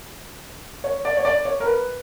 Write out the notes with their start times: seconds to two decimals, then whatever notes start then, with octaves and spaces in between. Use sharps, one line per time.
0.84 C#5
1.05 D5
1.17 C#5
1.25 D5
1.45 C#5
1.60 A#4
1.66 B4